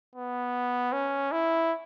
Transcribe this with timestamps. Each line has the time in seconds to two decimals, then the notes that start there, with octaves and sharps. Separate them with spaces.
0.16 B3
0.93 C#4
1.32 E4